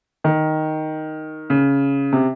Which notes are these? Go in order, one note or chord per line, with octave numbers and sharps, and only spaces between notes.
D#3
C#3
C3